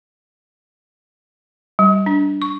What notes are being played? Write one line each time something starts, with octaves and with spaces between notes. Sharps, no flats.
G3
D4
C#6